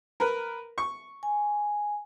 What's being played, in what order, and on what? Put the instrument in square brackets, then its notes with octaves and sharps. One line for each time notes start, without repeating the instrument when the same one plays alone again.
[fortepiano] A#4 B4
C#6
[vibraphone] G#5